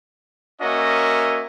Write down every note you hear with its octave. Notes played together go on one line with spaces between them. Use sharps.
A#3 C#4 F#4 A#4 D#5 E5